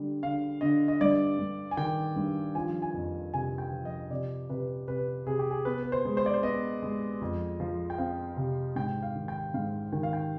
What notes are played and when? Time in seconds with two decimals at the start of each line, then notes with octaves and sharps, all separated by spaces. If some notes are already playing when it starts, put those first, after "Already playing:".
Already playing: D3 G3
0.23 D3 F5
0.61 D3 D#5
0.88 D#5
1.01 G2 D5
1.39 G2
1.71 G#5
1.77 D#3 G5
2.16 G2
2.55 F3 G#5
2.82 G#5
2.94 F2
3.33 C3 G#5
3.58 G5
3.71 F3
3.85 D#5
4.10 C3 D5
4.49 C3 B4
4.88 C3 B4
5.27 C3 G#4
5.39 G4
5.51 G#4
5.65 B3 B4
5.83 B4
5.92 C5
6.05 G#3
6.17 C5
6.26 D5
6.34 C5
6.43 B3 D#5
6.82 G#3
7.21 F2
7.60 F3
7.90 G5
7.98 C4 F5
8.37 C3
8.76 G#2 G5
9.03 F5
9.15 D#3
9.28 G5
9.54 G#2 F5
9.92 D#3 G5
10.03 F5
10.13 G5